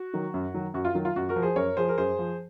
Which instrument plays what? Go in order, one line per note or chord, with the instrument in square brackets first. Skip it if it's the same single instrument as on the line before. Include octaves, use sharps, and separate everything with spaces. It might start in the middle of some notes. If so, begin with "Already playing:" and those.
Already playing: [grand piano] F#4
D#3 F#3
F#2
D#3 F#3
F#2 F#4
F4
D#3 F#3
F4
F#2 F#4
F#4 A#4
F3
G#4 C5
F#2 A#4 C#5
F3 G#4 C5
A#4
F#2 G#4 C5
F3